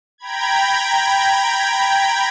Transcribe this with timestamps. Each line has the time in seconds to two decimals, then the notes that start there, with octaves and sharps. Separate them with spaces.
0.18 G5 A#5 B5 G#6